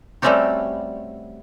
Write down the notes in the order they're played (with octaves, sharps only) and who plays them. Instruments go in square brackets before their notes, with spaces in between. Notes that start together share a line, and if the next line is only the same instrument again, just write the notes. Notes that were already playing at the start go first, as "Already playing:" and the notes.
[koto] G3 A3 C4 C#4 F#4 G4